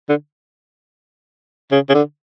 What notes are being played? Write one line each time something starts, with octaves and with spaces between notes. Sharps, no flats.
D3
C#3
C#3
D3